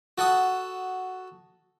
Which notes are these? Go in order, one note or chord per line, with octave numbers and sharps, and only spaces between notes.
F#4 A4 F#5 D#6